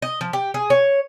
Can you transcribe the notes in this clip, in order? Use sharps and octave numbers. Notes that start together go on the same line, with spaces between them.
D#5
F3
G4
G#4
C#5